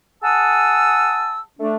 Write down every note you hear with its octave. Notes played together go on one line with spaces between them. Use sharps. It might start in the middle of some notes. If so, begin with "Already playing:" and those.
G#4 F#5 A5 D#6 E6
A3 D4